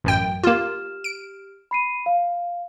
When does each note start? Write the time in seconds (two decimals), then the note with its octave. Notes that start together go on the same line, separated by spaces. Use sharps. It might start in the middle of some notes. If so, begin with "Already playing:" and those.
0.04 A1 F#2 G5
0.43 A#3 F4 G4 F6 E7
1.04 D7
1.71 B5 C7 D#7
2.06 F5